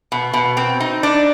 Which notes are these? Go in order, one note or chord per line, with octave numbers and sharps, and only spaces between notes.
B2
B2
C4
D#4
D4